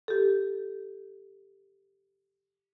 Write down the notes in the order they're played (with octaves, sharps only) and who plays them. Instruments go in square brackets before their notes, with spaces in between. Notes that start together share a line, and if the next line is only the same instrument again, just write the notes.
[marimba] G4 A4